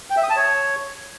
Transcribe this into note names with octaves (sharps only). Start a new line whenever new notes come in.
G5
E5
D#6
A5
C#5